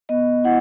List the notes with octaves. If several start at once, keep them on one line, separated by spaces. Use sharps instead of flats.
B3 D#5
E4 F#5